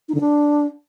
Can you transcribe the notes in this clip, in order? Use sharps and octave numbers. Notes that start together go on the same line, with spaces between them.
D#4
D3
D4